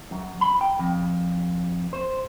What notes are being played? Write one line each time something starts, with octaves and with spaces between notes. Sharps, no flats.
F#2
B5
G5
F2
C5